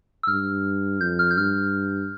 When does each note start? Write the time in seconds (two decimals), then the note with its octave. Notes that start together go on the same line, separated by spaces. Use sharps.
0.23 E6
0.27 G2 F6
1.01 F2 G6
1.19 F6
1.31 G6
1.37 G2 F6